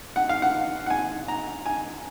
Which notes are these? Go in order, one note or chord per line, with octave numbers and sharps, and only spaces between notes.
F#5
F5
F#5
F#5
G#5
A#5
G#5